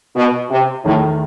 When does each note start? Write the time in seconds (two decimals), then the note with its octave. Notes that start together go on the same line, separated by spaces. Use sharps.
0.16 B2
0.51 C3
0.84 E2 A2 D#3 A3